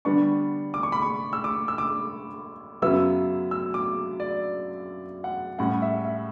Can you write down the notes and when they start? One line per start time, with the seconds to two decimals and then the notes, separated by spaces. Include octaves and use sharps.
0.05 D3 G3 B3 D4 C#6
0.74 D6
0.83 C#6
0.92 B5
1.02 C#6
1.33 E6
1.44 D6
1.68 E6
1.78 D6
2.82 F#2 C#3 F#3 B3 E4 E6
3.51 E6
3.74 D6
4.20 D5
5.24 F#5
5.58 A2 G3 C#4 F#5
5.82 E5
6.04 E5